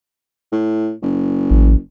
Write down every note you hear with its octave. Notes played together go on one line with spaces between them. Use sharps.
A2
F#1
A1